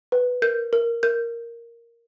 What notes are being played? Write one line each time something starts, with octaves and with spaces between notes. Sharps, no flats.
B4
A#4 G6
A#4
A#4 G6